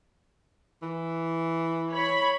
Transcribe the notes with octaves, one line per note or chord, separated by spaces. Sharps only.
E3
C#5 B5